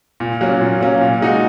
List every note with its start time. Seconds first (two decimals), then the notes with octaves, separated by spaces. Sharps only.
0.20 A#2
0.41 F#3 A#3 C#4 F4
0.61 A#2
0.81 F#3 A#3 C#4 F4
1.01 A#2
1.21 G#3 D#4 F#4